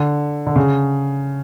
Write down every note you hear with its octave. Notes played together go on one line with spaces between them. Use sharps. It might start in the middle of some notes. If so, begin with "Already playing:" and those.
Already playing: D3
D3
C#3